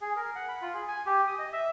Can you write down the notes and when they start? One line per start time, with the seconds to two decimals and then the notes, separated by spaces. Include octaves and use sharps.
0.01 G#4
0.16 A#4
0.35 F#5
0.48 B5
0.62 F4
0.74 G#4
0.88 G#5
1.06 G4
1.27 D#6
1.39 D#5
1.52 E5